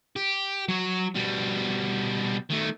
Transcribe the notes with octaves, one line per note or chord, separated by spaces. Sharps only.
G4
F#3 C#5
B2 G3
D#3 A3